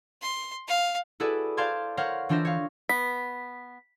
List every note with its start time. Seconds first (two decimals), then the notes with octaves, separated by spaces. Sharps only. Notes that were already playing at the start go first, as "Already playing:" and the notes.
0.22 C6
0.68 F5
1.20 E4 F#4 G#4 A4 B4 D5
1.57 C5 D5 F5 A5 C6 G#6
1.97 A#4 C5 C#5 F5 F#5
2.29 E3 D4 F4 C5 E5 A#6
2.45 C#5 F5
2.89 B3 B6